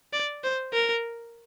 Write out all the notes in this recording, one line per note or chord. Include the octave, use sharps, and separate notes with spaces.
D5
C5
A#4